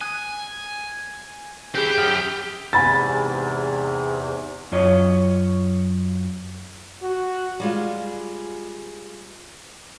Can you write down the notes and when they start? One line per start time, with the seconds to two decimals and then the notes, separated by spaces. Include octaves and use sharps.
0.01 G#5 D#6 F#6
1.75 C4 E4 G4 G#4 F#6 G6
1.98 F#2 G5 D#6 F6
2.73 E2 G#2 C3 G#5 B5 A6
4.72 F#2 F4 C#5 D#5
7.02 F#4
7.60 G3 G#3 F4